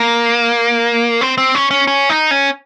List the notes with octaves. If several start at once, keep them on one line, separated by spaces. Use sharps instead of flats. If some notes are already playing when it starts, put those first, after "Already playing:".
Already playing: A#3
C4
C4
C#4
C#4
C#4
D#4
C#4